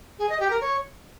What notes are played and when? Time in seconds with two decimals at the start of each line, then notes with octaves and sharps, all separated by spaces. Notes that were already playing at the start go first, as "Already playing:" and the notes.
0.19 G#4
0.29 D#5
0.40 G4
0.50 A#4
0.61 C#5